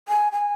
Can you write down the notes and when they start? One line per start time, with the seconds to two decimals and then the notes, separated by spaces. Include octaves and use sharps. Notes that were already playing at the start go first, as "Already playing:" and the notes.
0.08 G#5
0.32 G#5